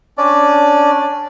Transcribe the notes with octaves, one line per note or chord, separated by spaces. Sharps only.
C#4 D4 D5